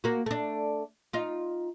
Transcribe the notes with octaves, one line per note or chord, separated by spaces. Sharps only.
A#3 F#4
A3 D4
D#4 F4